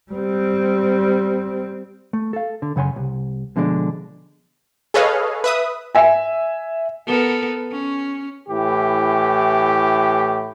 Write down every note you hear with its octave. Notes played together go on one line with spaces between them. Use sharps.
G3 C4
A3
A4 F5
D3
F#2 C#3 F#5 G#5 C6
C2
B2 D3 F3 G#3 C#4 D4
G#4 A4 B4 C#5 D#5 F5
B4 E5 D#6
E5 G#5
B3 A4 A#4
C#4
A2 E3 G4